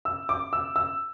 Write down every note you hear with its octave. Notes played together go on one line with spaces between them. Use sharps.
E6
D6
E6
E6